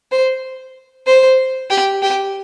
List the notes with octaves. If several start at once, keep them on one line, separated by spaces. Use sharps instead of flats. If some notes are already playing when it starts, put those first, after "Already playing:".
C5
C5
G4
G4